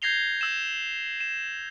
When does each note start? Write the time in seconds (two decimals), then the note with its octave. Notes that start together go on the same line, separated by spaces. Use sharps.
0.02 G6 G#6 A#6 C7 F7 G7
0.41 E6 E7
1.20 E7